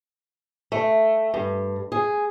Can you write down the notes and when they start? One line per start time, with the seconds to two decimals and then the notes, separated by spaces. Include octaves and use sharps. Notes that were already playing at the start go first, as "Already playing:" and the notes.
0.72 A3
1.34 G2
1.92 G#4